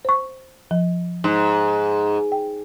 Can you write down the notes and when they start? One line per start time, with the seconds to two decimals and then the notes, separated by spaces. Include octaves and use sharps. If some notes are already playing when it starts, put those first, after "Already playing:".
0.05 C5 C#6
0.71 F3
1.24 G#2
2.32 G5